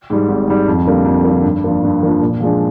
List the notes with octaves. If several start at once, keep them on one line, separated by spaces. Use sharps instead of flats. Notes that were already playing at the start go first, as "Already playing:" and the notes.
G#2 G3
G#1
G#2 G3
F2
D3 G3 A#3
F2
D3 G3 A#3
G2
F3 A#3 D4 F4
G2
F3 A#3 D4 F4
A#2
F3 G#3 D4